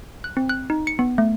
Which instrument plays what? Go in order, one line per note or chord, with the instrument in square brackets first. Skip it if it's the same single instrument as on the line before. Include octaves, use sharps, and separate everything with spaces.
[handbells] F#6
C4
F#6
D#4
C#7
B3
A3